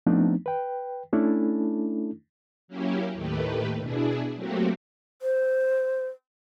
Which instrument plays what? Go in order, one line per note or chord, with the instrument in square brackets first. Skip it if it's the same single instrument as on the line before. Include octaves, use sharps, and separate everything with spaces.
[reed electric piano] F3 A3 B3 C4 D4 D#4
B4 G5
A3 C#4 D4 E4 A4
[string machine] F#3 A#3 C#4 E4 G4
D#2 A2 D#3 A3 G4 B4
B2 D4 E4 G#4
F#3 A3 A#3 C4 F#4 G4
[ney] C5